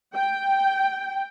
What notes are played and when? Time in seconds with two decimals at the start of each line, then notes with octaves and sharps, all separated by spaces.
0.15 G5